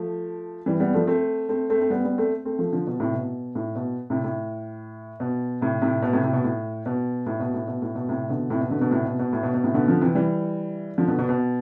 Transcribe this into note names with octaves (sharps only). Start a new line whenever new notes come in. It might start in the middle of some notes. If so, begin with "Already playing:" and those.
Already playing: F3 A3
E3 G3
G3 B3
F3 A3
A3 C4
A3 C4
A3 C4
C4
G3 B3
G3 B3
A3 C4
A3 C4
F3 A3
D3 F3
B2
A2 C3
B2
A2
B2
A2 C3
A2
B2
A2 C3
A2 C3
B2
A2 C3
A2 C3
B2
A2
B2
A2
B2
A2
B2
A2
B2
A2 C3
B2 D3
A2 C3
B2
B2 D3
B2 D3
A2 C3
B2
B2
A2
B2
B2
A2 C3
B2 D3
D3 F3
C3 E3
E3 G3
D3 F3
B2 D3
B2
B2